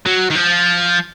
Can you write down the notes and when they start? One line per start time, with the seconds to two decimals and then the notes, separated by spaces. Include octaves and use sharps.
0.07 F#3
0.31 D#3
0.36 F3